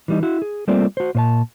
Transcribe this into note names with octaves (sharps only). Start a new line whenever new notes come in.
E3 G3 D#4
E4 F#4
G#4
G3 A3 A#3 C4 F4 D5
F#4 C5
A#2 C5 A5